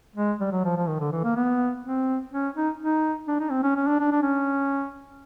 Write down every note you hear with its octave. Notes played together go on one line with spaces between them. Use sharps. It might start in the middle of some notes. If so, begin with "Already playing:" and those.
G#3
G3
F#3
F3
F3
D#3
D3
E3
A#3
B3
C4
C#4
D#4
D#4
D4
D#4
C4
C#4
C#4
D4
D4
D4
C#4